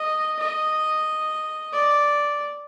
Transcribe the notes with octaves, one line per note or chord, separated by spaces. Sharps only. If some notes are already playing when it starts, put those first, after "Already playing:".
Already playing: D#5
D#5
D5